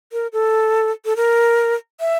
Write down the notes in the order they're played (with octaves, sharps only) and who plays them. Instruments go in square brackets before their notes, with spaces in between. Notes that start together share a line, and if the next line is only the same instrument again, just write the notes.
[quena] A#4
A4
A4
A#4
E5